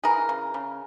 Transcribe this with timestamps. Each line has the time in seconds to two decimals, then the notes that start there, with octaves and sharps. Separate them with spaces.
0.04 E3 G#4 A#4
0.29 C#3
0.54 C#3